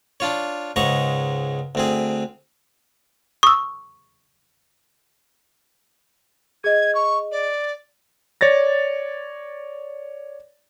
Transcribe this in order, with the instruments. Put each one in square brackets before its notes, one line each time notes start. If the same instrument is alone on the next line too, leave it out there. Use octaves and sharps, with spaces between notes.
[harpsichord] D4 F4 C#5
C#2 G#2 G#3 A#5 C#6
D2 C4 G#4
[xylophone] C#6 [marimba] D#6 E6
[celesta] G#4 D#5 [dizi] G#6
[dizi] C#6
D5
[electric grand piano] C#5 D5 A6 A#6